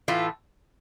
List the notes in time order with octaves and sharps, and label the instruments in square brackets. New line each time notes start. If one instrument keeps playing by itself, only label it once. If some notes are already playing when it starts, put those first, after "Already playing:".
[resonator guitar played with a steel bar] A2 E3 A3 F4